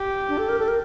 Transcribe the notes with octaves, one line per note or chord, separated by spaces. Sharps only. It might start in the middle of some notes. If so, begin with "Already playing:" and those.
Already playing: G4
D4
A4
A#4
A4
A#4